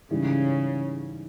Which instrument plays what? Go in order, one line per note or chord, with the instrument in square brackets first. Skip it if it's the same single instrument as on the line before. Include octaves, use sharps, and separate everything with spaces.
[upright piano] G#2 E3 G3 [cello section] C#3